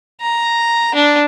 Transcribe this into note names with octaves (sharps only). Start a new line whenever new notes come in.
A#5
D4